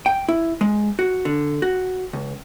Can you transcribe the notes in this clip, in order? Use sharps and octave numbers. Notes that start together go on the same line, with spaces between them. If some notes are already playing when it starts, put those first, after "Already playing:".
G5
E4
G#3
F#4
D3
F#4
C#2